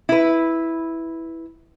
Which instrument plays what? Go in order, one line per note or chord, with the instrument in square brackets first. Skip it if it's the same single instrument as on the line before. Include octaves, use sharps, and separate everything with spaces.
[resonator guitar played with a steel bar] E4 B4